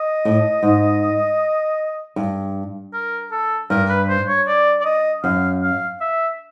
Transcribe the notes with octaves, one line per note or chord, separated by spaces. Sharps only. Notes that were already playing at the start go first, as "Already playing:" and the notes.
Already playing: D#5
A2
G#2
G2
A#4
A4
G2 A#4
B4
C5
C#5
D5
D5
D#5
F#2 F5
F5
E5